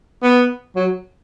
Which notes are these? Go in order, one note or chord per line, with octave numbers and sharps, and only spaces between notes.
B3
F#3